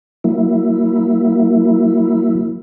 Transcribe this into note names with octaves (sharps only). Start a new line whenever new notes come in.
F#3 A#3 E4